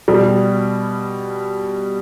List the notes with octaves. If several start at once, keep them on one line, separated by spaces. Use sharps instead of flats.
B2 G3